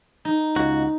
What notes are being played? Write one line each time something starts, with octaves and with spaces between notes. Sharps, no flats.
D#4
C#2 F#4